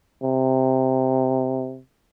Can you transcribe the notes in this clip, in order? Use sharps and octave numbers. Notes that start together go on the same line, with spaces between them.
C3